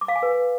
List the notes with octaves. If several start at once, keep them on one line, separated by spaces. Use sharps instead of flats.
D6
F5
G#5
B4